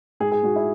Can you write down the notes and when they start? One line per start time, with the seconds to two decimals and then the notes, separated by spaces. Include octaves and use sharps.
0.20 G#2 G#4
0.32 G#4
0.43 G#2 F#4
0.56 E4